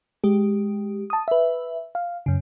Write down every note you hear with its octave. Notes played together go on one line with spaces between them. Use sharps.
G#3 G4
A5 D#6
B4 E5
F5
F#2 C#3